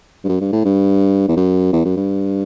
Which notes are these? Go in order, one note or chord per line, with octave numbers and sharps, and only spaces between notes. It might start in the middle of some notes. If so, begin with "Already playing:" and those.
G2
F#2
G2
A2
G2
E2
F#2
E2
F#2
G2